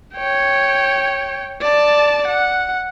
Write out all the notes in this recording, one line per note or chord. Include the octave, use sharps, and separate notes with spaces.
C#5 G5
D5 A5
F#5